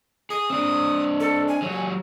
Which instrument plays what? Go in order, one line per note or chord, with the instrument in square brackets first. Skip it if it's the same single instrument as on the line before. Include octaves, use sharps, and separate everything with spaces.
[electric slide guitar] G#4 [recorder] D#6
[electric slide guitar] C4 D4
[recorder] A4
G#5
[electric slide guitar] F#3 G4 C#5